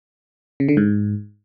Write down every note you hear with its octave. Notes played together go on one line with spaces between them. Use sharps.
C#3
D3
G#2